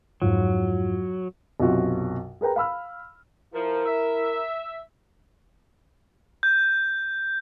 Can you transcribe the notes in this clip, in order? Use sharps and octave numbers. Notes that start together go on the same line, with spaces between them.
F2 G#2 F#3 F4
B1 F#2 C3 F4 F#4
G#4 A#4 B4 G5 A#5
F5 B5 E6 F6
F3 E4 A#4
E5
G6